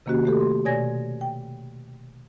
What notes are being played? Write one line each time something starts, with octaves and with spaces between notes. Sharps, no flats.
C3 D#3 A#3 C#4 F#4 G4
A3 G4 A4
C6
B2 C#5 D5 G#5 G#6 A#6
G5